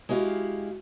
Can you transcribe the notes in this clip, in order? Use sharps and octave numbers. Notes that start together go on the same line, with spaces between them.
G#3 E4 F#4 G4 F5